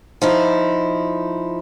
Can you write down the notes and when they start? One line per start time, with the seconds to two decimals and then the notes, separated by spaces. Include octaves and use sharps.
0.22 F3 D#4 E4